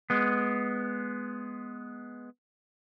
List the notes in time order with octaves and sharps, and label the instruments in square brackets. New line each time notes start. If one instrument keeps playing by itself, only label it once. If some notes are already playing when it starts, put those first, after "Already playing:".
[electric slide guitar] G#3 B3